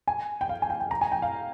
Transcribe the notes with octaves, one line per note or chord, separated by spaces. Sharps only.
G#5
G5
F5
G#5
G5
G5
A#5
G#5
G5
F5